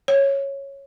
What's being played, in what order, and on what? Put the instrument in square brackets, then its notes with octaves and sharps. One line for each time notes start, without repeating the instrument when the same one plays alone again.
[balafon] C#5